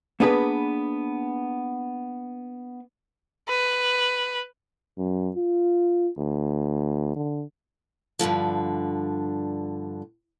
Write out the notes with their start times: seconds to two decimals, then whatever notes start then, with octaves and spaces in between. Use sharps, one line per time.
0.20 A#3 B3 D4 G#4 B4
3.49 B4
4.98 F#2
5.36 F4
6.18 D2
7.16 D3
8.19 G2 B2 D3 F3